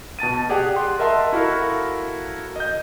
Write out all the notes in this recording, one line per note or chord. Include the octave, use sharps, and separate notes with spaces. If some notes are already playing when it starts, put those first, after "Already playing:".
B2 A5 A6 D#7
G4 G#4 D5 F#5 G5
F#5 C6
A#4 D#5 E5 F#5 A5 C6
E4 F#4 A4 A#4 F5
D#5 G6